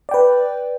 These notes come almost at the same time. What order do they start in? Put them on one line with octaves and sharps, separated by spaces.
D5 G5 B4